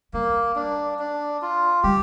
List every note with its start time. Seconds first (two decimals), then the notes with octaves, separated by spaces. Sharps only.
0.13 G3 A#3
0.56 D4
0.99 D4
1.42 F4
1.83 G3 G4